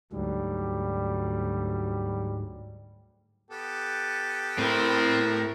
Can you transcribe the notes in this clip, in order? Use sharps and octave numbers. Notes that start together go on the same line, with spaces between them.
D2 G#2 F#3 G3
B3 G4 A4
A2 C4 E4 A#4